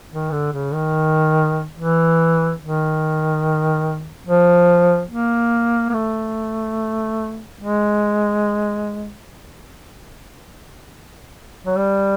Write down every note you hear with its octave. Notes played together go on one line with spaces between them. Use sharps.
D#3
D3
C#3
D#3
E3
D#3
F3
A#3
A#3
A3
G#3
F#3
G3